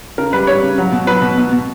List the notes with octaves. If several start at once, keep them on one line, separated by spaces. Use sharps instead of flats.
C#3 A#4
G3 B4
G3 C#5
C#3
F#3
B2
F#3 B4
B2
B2
B2